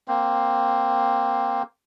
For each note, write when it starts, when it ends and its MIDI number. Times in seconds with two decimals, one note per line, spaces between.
0.08 1.63 58
0.08 1.63 60